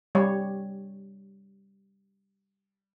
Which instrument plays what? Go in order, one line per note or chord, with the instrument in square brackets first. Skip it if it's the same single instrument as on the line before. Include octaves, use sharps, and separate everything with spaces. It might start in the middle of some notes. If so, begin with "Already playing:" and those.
[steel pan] G3 C#5